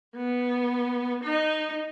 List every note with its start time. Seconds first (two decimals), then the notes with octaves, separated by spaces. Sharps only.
0.16 B3
1.24 D#4